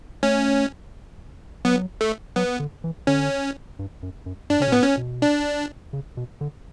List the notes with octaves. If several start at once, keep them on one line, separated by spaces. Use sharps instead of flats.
A3 C#4
F#3 B3
A3
F#3 B3
D3
E3
D3 C#4
G2
F#2
F#2
G2 D4
C#3 C#4
B2
A2 B3
C#4
B2
D4
C#3
B2
D3